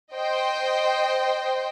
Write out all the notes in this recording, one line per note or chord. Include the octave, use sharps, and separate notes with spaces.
C5 D#5 G5